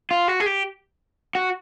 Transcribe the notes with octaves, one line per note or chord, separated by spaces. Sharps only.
F4
F#4
G#4
G4
F#4